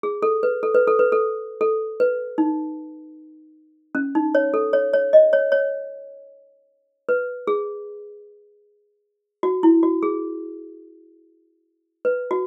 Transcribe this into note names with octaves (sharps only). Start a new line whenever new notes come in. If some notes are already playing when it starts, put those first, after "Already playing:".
G#4
A4
B4
A4
B4
A4
B4
A4
A4
B4
D#4
C#4
D#4
C#5
A4
C#5
C#5
D#5
C#5
C#5
B4
G#4
F#4
E4
F#4
G#4
B4
F#4